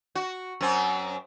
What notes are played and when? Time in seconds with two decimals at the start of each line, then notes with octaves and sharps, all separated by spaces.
0.15 F#4
0.61 F#2 C4